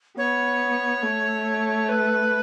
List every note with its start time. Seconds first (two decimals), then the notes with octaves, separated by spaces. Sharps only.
0.18 B3 C#5
1.03 A3
1.89 B4